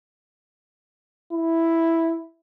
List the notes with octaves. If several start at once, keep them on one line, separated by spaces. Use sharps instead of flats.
E4